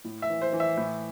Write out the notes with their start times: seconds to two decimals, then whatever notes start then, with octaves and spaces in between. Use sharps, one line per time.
0.04 A2
0.22 E5
0.30 E3
0.41 C5
0.53 E3
0.60 E5
0.77 A2